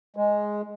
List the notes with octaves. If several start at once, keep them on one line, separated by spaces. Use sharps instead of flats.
G#3